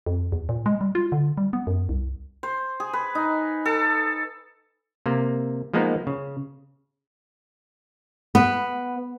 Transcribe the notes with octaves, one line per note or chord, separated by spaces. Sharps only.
F2
E2
A#2
G#3
G3
F4
D3
G3
B3
F#2
C2
C5
G#4
B4
D#4
A4
C3 A#3
F3 G#3 A#3 B3 D#4
C#3
B3